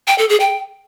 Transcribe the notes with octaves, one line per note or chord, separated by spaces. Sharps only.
G5
A4
G#4
G5